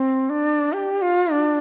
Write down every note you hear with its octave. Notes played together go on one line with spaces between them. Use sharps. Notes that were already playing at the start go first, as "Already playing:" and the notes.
Already playing: C4
D4
G4
F4
D4